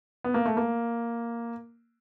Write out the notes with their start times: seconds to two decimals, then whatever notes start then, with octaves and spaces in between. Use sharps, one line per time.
0.24 B3
0.34 A#3
0.46 A3
0.57 A#3